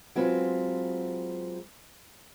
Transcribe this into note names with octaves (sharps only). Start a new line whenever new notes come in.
F#3 G#3 C4 F4 B4